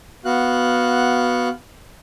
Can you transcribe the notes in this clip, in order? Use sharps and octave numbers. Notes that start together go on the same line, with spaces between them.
B3 F#4 F5 F#6